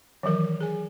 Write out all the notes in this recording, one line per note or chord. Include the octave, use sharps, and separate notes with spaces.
D#3 E3 F#3 A#4
G#4 G#5